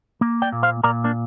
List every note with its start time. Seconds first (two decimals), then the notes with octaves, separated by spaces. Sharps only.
0.21 A#3
0.42 D5 G5
0.52 A#2
0.63 C5 F5
0.84 A#2 A#4 D5
1.04 A#3 D4